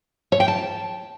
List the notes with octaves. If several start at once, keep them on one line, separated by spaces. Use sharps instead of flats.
C#5
G5
A5